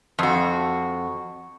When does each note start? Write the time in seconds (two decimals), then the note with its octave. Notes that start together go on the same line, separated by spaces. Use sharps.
0.19 F2 F#4